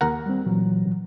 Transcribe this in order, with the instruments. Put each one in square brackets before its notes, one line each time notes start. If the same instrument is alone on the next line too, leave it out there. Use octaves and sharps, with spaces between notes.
[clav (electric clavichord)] D#2 A#4 F#5
[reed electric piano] G3 C4
A#2 E3 F#3